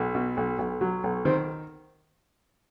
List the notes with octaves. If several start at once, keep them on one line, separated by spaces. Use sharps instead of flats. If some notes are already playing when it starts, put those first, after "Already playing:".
Already playing: B1
B2
B1
B1
F#3
B1
D#3 C4